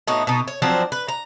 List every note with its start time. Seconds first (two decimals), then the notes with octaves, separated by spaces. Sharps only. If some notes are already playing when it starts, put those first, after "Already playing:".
0.07 A2 B3 D#4 F#4
0.27 B2 D#4
0.48 C#5
0.62 F3 F#3 C4 D4
0.92 B4
1.08 A#5